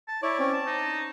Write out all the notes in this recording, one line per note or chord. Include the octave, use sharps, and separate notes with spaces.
A5
E4 C#5 D5
C4 C#4 C#5
A5
D#4